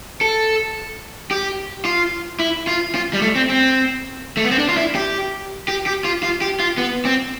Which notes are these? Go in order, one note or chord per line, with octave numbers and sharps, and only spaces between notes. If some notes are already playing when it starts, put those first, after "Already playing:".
A4
G4
F4
E4
F4
F4
G3
A3
C4
C4
A3
B3
C4
D4
F4
E4
G4
G4
G4
F4
F4
G4
F4
B3
C4